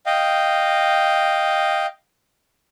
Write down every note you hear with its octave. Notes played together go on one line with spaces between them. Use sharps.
D#5 F5 G5